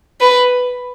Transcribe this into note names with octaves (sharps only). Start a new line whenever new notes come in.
B4